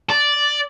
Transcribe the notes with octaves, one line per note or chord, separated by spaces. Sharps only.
D5